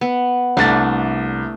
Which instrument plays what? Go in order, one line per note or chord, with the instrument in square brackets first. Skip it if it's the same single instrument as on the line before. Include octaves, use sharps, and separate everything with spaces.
[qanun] B3
[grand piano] C2 A6 [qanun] A3 D4